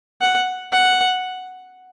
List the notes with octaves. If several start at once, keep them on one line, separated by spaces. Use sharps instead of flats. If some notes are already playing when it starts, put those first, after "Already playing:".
F#5
F#5